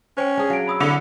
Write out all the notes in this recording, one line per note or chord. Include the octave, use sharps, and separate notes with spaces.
C#4 C5 G5 G#5
D4 G#4
F#3 F5 D7
B5 D#6 E6
D3 E4 F7